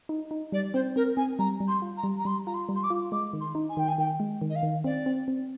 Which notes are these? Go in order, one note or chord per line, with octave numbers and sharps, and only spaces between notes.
D#4
D#4
G3 D5
C4 C5
C4 A#4
C4 G#5
G3 A#5
G3
C6
F4
A#5
G3
A#5
G3 C6
F4 A#5
C6
G3
C6
D6
F4
G#3 D6
D#3
C6
D#4
G#5
D#3 G5
G#5
D#3 G5
G#3
D#3
D#5
F5
D#3
C4 D5
C4
C4